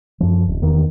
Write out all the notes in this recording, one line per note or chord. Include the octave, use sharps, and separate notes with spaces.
F#2 F3
D1
E2 D#3